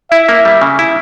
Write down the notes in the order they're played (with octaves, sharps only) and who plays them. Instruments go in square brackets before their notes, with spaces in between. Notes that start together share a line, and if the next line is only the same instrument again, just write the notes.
[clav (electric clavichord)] E4 [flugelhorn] E5
[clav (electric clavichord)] A#3
G3
C#3
E4